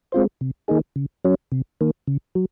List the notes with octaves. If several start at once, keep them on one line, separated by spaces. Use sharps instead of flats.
G#3 C4 F4 C5
C3
D#3 A#3 D#4 G#4
C#3
F#3 C#4
C3
D#3 A#3
C#3
F#3